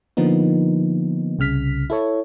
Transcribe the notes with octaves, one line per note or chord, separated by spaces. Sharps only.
D3 F3 A#3 B3 D#4
C2 C#3 F6 B6
E4 A4 C#5